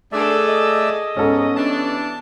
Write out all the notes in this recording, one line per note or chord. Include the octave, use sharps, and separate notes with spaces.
D#3 G3 A3 D4 G#4 A4 D5 E5
D#5
G#2 B3 C#4 A4
E3 G3 D4 A5